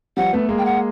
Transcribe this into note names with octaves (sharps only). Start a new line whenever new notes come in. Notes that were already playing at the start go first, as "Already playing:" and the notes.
F3 G3 F#5
A3 B3
G#3 A#3
G5
F#5